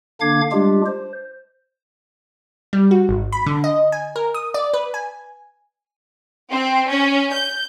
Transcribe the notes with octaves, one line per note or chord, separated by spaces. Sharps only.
D3 A#3 D4 F5 D6 G#6
G3 G#3 D4 F4 G4
C5
G3
F#4
G#1
B5
D3
D#5
G#5
A#4
D#6
D5
B4
G#5
C4
C#4
G6